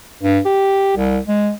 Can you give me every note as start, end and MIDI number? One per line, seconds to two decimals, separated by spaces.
0.23 0.40 43
0.45 0.95 67
0.96 1.19 36
1.28 1.51 56